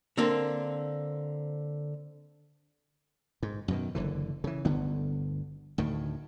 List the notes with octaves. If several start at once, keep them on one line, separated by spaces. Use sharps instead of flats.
D3 A#3 C4 D4
G#2
F#2 B2 D#3
F#1 D3 E3
C#3 E3
G1 D2 D3 B3
D2 A2 D#3